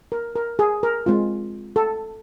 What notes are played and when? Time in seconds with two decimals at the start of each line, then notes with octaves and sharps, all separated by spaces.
0.12 A#4
0.36 A#4
0.59 G#4
0.83 A#4
1.06 G#3 C4 F4
1.76 A4